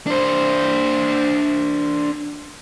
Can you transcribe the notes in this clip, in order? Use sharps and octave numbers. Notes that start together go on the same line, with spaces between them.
D4 C5